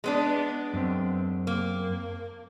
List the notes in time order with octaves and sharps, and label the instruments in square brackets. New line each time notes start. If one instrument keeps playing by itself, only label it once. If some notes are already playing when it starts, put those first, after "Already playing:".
[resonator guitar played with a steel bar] G#3 B3 D4
[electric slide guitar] F#2 C4
[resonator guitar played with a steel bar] A#3